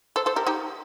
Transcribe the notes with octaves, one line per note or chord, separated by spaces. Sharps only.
A4 C5
A4 C5
G4 A#4
D#4 G4